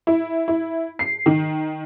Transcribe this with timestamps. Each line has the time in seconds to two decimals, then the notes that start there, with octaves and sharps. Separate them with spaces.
0.07 E4
0.48 E4
0.99 C7
1.26 D#3